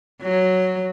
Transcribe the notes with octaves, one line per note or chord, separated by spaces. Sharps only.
F#3